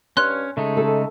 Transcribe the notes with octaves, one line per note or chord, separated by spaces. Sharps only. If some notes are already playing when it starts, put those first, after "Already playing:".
G2 C#4 C#5 C6 F6 F#6
C#3 G#3 A3 D#4
A4